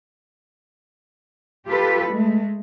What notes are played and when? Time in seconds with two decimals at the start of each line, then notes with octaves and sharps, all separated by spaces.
1.67 F4 G4 A4 B4
2.11 G#3 A3